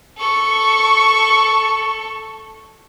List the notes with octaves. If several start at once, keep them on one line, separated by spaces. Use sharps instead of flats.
A4 C#6